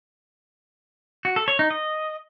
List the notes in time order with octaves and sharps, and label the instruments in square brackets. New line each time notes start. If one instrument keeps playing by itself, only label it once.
[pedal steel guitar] F#4
A4
C#5
D#4
D#5